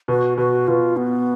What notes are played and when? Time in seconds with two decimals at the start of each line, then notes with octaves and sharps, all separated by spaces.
0.08 B2 F#4
0.37 B2 F#4
0.68 B2 F4
0.97 B3